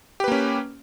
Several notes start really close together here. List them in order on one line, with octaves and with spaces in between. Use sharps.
G4 B4 A#3 C#4